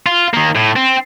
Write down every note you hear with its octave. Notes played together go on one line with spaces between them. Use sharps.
F4
D#3 A#3
A2
C4